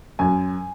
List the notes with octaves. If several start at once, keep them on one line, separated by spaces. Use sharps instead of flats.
F#2 G#5